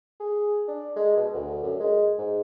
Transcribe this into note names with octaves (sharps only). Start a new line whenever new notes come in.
G#4
D4
G#3
B2
D2
F#2
G#3
G#2